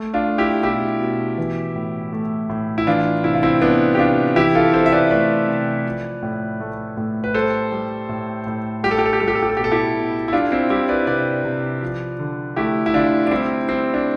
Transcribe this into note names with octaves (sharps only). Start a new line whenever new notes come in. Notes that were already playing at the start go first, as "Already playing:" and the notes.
Already playing: A3
D4 F4
A3
E4 G4
B2 E4 G4
B2
E3
A2
A3
A2
E4
E3 D4 F4
C3 E4
F4
C4 E4
G3 B3 D4
G4
C3 D4 F4
E3 E4 G4
F4 A4
C3 A4 C5
E5
B4 D5
A3 B4 D5
C3
F3
A2
A3
A2
B4
G3 A4 C5
G3
A2
A2
G3 G4
A4
G4
A4
G4
G3 A4
G4
A4
G4
A4
B2 G4
A4
E4 G4
B2
E4
G3 D4 F4
C4 E4
G3 E4 G4
B4 D5
C3 B4 D5
C3
F3
D3
A3 E4 G4
E4
D3 D4 F4
D4
G3 C4 E4
G3 C4
D4